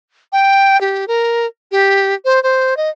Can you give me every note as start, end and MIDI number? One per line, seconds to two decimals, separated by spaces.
0.32 0.79 79
0.81 1.05 67
1.08 1.46 70
1.72 2.14 67
2.25 2.42 72
2.43 2.77 72
2.77 2.89 75